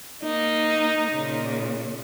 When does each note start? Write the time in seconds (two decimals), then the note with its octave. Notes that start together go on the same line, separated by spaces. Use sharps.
0.24 A#3 D#4
1.12 A#2 C#3